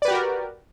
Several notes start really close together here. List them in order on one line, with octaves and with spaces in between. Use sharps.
D5 B4 G4 F#4 A#4